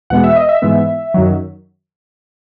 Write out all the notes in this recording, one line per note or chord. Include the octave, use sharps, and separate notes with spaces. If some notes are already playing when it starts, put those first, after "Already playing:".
E2 B2 G#3 B3 F#5
E5
D#5
E5
G#2 E3 G#3 B3
F#2 D#3 F#3